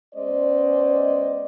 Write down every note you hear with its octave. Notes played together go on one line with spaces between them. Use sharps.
G#3 B3 C#4 C5 D5 D#5